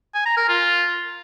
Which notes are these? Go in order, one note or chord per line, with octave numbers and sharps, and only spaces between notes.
G#5
A#5
A#4
F4